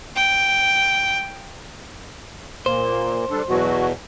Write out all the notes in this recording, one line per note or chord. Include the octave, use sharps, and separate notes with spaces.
G5
A#2 A#3 C5
G3 D4 A4
E2 B2 F#3 F#4